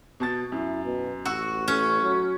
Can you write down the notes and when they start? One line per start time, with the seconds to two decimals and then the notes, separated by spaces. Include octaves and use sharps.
0.20 B2 A5 A6
0.52 F#2 E4
0.85 B2
1.25 A1 F#4 F#5 C#6 E6
1.68 A3 C#4
2.02 F#3